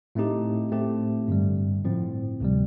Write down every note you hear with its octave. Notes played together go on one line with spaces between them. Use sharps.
A2 A3 C4 D#4 G4
A2 A3 C4 G4
G2 D3 G3
A2 F3 C4
D2 C3 G3